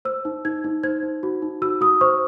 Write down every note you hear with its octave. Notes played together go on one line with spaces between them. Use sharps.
C5 E6
D#4
D#4 G#6
D#4
C5 G#6
D#4
F#4
D#4
F#4 E6
F#4 D#6
C5 C#6